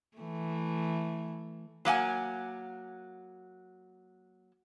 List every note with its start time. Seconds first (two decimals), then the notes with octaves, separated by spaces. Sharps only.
0.17 E3 A3
1.85 F#3 A#3 F#5 G#5